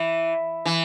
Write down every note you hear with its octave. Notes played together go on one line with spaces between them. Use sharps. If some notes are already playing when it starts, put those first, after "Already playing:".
Already playing: E3
E3